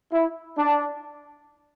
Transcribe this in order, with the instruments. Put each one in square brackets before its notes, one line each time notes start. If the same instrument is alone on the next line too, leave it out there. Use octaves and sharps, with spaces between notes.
[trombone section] E4
D4